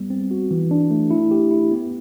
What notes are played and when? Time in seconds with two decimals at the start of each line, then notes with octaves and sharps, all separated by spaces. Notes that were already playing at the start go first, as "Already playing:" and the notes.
Already playing: G3 B3
0.10 C4
0.31 F#4
0.51 E3
0.71 D4
0.91 A3
1.11 E4
1.31 G4
1.51 E4
1.71 B3